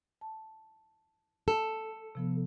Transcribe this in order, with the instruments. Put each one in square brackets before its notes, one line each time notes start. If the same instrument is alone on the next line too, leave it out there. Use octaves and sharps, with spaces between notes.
[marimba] A5
[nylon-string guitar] A4
[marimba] C3 F3 B3